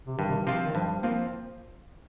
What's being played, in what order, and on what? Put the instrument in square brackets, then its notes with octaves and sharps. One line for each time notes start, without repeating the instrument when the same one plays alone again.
[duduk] C3
[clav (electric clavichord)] G2 [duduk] D#3
[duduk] C3
D#3
[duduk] C3 [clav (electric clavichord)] F3 C4 F4
[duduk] D#3
[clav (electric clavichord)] G2 [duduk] F3
[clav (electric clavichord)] F3 C4 F4 [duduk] A#3